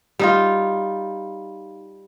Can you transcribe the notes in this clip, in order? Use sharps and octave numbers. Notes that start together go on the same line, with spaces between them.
G3 D#4 F4